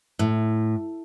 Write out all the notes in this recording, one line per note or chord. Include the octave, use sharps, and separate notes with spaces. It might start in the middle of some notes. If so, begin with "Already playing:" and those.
A2